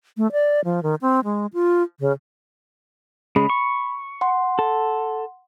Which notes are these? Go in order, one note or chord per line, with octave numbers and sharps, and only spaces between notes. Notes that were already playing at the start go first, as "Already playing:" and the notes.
A3
D5
F3
D#3
C4
G#3
F4
C#3
C#3 G#3 B5
C#6
F#5 C6
A4